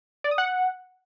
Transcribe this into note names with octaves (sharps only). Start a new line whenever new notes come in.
D5
D#6
F#5